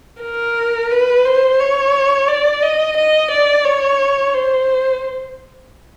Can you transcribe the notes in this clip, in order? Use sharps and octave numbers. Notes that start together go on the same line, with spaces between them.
A#4
B4
C5
C#5
D5
D#5
D#5
D5
C#5
C5